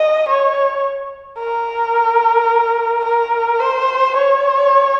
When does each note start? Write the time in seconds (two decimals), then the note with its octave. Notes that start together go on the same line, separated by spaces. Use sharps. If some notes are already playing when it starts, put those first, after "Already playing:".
Already playing: D#5
0.29 C#5
1.39 A#4
3.04 A#4
3.60 C5
4.16 C#5